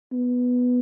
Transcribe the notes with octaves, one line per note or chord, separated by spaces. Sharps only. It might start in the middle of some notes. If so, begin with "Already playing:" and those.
B3